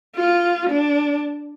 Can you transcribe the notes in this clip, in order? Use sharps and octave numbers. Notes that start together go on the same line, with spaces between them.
F4
D4